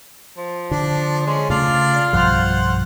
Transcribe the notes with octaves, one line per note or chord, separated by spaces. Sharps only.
F3
D3 D4
G#3 C#4
C#3 A3 D4 F4 D5
B1 G2 F3 C5 F#5